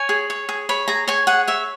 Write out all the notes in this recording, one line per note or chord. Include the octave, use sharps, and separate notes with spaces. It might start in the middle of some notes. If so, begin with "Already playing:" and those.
Already playing: C#5 G#5
G#4
C#5
G#4
C#5 B5
G#4 A#5
C#5 G#5
G#4 F#5
C#5 E5